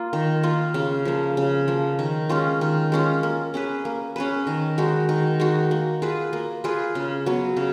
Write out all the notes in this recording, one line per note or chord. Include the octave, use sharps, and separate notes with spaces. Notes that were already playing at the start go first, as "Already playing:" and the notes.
Already playing: A#3 F4
D#3
A#3 F4
C#3
F3 A#3
C#3
F3 A#3
D#3
G#3 C#4 F4
D#3
G#3 C#4 F4
A#3
C#4 G#4 B4
A#3
C#4 G#4 B4
D#3
G#3 D#4 F#4
D#3
G#3 D#4 F#4
A#3
F4 G#4 B4
A#3
F4 G#4 B4
C#3
F#3 B3
C#3